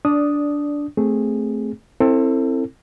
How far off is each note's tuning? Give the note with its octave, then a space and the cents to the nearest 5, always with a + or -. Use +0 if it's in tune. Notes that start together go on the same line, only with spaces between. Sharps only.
D4 -10 D5 +0 D#6 +0
A3 +0 C4 +0 G#4 -10
C4 +20 E4 +0 A4 +30